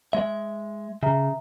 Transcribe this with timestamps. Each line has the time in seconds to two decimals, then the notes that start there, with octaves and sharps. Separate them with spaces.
0.13 G#3 E5
1.03 C#3 E5 A#5